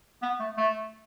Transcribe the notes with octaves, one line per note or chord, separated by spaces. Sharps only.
B3
A3
A3